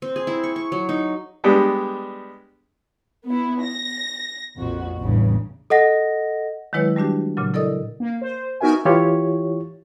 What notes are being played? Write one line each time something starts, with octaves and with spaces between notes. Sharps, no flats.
C4
G#4
E4
C#6
C#6
F#3
D#4
G3 G#3 B3 D4 G4
B3 E4
A#6
A#1 F2 F#4
A1 E2 G2 C#3
A4 D#5 F#5 A#6
D#3 F#3 G#3 E4 B4 C#5
G3 A3 D4 F#4 G4
A#2 C#3 F#3
E4 A4 A#4 D5 D#5 D#6
A#3
C5
B3 D#4 F#4 A#4 E5 G#5
E3 E4 F4 G4 C#5